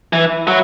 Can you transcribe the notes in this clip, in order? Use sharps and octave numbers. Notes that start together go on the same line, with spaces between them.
E3 E4
F#3